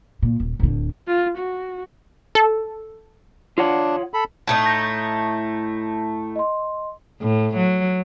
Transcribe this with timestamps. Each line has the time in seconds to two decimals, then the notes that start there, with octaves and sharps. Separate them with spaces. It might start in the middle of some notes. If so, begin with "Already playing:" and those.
0.23 A#2
0.40 D#1
0.59 D1 D3
1.07 F4
1.38 F#4
2.35 A4
3.58 D4 F4 C#5 F#5
4.14 A4 B5
4.47 A2 A3 D#4
4.64 A5 G6 A#6
6.36 D#5 C6
7.22 A2
7.57 F#3